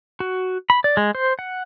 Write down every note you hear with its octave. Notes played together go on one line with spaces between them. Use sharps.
F#4
B5
D5
G#3
C5
F#5